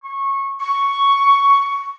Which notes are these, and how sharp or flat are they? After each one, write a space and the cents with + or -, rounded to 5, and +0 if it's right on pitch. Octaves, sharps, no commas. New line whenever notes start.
C#6 -20
C#6 +5